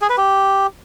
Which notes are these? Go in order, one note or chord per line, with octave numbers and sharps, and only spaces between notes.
G#4
B4
G4